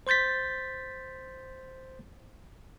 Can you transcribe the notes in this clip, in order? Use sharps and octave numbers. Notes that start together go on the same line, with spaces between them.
C5 C6 G6 A6 B6